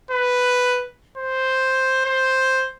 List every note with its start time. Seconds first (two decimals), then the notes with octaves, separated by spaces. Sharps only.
0.11 B4
1.17 C5
2.05 C5